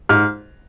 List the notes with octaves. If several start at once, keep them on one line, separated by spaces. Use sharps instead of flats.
G#2 F6